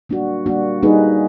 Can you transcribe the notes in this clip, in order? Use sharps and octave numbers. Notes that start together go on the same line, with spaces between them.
G3 A#3 D4 F#4
G3 A#3 D4 F#4
G3 A#3 D#4 G#4 B4